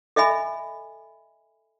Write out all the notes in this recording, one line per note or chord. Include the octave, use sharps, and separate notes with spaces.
A4 D#5 E5 G#5 B5